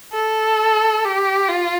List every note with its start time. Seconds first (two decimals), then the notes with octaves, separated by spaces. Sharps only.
0.13 A4
1.05 G4
1.49 F4